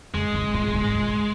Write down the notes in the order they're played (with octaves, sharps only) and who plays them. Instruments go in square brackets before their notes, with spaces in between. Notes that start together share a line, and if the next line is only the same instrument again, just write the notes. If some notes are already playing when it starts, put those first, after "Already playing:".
[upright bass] F#2 [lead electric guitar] G#3
[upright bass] G#2
A#2
G#2
A#2